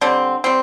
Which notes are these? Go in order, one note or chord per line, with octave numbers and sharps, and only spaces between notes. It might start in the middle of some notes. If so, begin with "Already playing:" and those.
D3 G3 C4
G3 C4